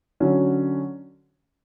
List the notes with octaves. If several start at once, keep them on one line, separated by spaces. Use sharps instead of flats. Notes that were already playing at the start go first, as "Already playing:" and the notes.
D3 F#3 C#4